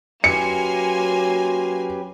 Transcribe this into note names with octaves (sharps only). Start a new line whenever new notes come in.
F#3 A#3 C#4 G4 B4 G#5 C6 C#7